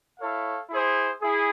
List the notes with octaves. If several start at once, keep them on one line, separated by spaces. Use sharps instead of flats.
E4 A4 C#5 F5
E4 G#4 C5
E4 G#4